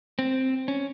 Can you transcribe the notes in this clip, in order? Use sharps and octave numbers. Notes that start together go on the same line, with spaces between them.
C4
C#4